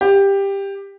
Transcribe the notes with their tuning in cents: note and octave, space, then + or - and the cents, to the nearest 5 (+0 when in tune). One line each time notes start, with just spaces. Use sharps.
G4 +10